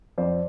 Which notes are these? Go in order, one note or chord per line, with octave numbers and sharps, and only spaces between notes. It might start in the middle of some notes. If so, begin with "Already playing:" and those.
F2 C5 D5